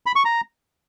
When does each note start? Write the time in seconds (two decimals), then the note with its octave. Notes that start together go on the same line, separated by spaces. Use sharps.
0.06 B5
0.16 C#6
0.25 A#5